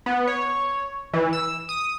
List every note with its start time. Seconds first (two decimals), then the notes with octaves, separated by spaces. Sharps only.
0.06 B3
0.27 C#5
1.13 E3
1.33 E6
1.69 D#6